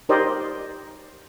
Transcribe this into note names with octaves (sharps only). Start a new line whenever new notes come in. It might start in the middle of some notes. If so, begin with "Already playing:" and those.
D#4 G4 A#4 C5 D5 D#5